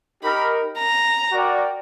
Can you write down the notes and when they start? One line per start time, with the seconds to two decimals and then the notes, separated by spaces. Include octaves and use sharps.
0.23 D#4 G4 A#4 B5
0.78 A#5
1.32 F#4 A#4 D5 G5